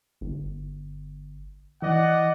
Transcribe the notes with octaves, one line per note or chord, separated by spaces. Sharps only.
G1
E3 D5 D#5 F#5